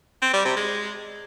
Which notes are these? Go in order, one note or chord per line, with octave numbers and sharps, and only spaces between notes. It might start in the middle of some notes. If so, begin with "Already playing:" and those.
C4
G3
C3
G#3